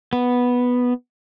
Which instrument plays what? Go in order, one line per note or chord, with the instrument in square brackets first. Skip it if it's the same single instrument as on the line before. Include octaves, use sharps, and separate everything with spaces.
[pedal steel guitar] B3